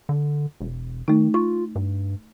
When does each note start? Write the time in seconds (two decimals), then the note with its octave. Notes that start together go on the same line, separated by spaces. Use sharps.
0.09 D3
0.61 E1
1.08 D#3 A3 D#4
1.34 F4 C#6
1.75 G2